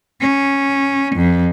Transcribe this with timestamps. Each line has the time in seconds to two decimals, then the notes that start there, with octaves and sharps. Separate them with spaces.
0.21 C#4
1.16 F2